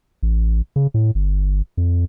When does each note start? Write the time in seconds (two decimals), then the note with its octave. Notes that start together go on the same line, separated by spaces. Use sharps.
0.23 A1
0.76 C#3
0.94 A2
1.15 G1
1.77 F2